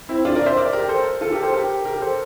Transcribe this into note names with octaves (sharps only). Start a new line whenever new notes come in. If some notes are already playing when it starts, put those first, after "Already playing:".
C4 E4
D4 F4
A#4 D5
C5 E5
A#4 D5
G4 A#4
A4 C5
F4 A4
G4 A#4
A4 C5
G4 A#4
G4 A#4
A4 C5